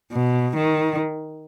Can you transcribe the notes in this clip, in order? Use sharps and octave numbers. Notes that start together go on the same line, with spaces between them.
B2
D#3